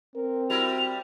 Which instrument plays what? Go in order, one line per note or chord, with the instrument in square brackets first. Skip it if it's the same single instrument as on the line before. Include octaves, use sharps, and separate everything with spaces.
[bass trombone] C4 [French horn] A#4
[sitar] G3 E4 A#4 [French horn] F#4 [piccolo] F7